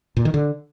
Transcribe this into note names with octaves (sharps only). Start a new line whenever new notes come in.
A#2
D#3
D3